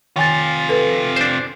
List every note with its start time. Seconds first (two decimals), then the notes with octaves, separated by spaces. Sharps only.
0.16 C3 D#3 F4 G5 G#5 A6
0.69 A4 B4
1.16 D4 C5